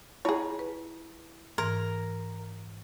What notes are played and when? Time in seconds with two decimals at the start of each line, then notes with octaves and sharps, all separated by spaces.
0.25 E4 F4 G#4 C#5 A5
0.59 B4
1.58 G#2 E3 A#4